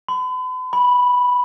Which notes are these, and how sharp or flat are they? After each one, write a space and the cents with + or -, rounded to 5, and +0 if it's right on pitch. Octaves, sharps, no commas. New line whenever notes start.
B5 +45
B5 -5